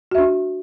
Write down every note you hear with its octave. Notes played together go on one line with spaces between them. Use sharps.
D4 F#4 E5